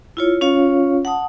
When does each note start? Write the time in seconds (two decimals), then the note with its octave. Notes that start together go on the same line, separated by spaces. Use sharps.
0.17 E4 F4 C#5
0.41 C#4 F4 C#5 F5
1.05 F#5 A5 D#6